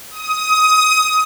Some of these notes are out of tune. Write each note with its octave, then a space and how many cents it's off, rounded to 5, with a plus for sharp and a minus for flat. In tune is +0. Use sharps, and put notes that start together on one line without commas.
D#6 +20